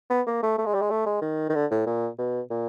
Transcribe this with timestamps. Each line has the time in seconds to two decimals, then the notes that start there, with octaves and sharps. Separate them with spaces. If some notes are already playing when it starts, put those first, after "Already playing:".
0.10 B3
0.27 A#3
0.43 A3
0.58 A3
0.66 G#3
0.74 G3
0.82 G#3
0.91 A3
1.06 G#3
1.22 D#3
1.49 D#3
1.55 D3
1.71 A2
1.86 A#2
2.18 B2
2.50 A#2